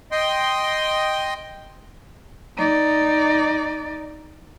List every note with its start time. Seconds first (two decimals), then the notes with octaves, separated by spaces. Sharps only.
0.12 D#5 G5 C6
2.57 D#4 D5